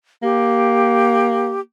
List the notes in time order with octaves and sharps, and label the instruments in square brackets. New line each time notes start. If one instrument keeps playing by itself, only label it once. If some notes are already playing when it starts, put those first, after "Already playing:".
[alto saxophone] A#3 [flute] G4